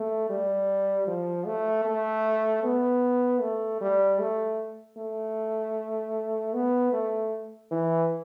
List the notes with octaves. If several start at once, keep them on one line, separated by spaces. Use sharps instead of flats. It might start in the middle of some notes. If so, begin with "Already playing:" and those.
Already playing: A3
G3
F3
A3
A3
B3
A3
G3
A3
A3
B3
A3
E3